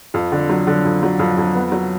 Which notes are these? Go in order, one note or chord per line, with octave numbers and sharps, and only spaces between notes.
F2
D3
F#3
D3
F2
F#3
F2
F2
B3
F#3